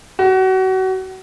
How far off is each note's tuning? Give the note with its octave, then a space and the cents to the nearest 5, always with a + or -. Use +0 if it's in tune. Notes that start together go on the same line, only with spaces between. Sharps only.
F#4 +30